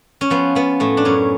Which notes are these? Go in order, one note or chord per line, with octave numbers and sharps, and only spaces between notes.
C#4
F3 B3
F3 B3
A2 A3
D4
F#2 C#4